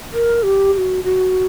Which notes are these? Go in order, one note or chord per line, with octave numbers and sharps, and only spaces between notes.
A#4
G4
G4
F#4
F#4